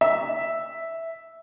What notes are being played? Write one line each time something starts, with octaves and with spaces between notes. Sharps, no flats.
E5